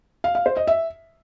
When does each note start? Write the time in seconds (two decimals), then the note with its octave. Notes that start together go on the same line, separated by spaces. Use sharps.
0.24 F5
0.35 F5
0.46 C5
0.57 D#5
0.67 E5